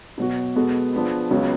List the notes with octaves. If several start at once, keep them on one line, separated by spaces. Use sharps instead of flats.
B2 F#3 B3 F#4
B2 G#3 B3 F#4 A4
F3 B3 D4 G#4 B4
C#2 C#3 F#3 B3